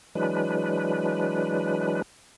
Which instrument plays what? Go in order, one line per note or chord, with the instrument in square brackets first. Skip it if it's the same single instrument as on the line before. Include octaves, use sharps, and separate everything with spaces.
[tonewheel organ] E3 F#3 G#3 D4 B4